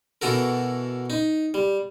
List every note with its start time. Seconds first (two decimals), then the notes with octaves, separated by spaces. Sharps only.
0.22 B2 E3 F#4 A4 A#4
1.10 D#4
1.54 G3